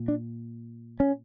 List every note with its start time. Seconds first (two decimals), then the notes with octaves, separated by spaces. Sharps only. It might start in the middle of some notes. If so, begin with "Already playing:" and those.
Already playing: A#2
0.08 D4
1.00 C#4